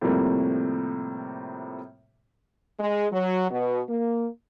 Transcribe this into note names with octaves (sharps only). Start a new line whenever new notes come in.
A2 C3 F3 G3 A#3 C4
G#3
F#3
B2
A#3